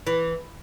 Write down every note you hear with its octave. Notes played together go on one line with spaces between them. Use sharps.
E3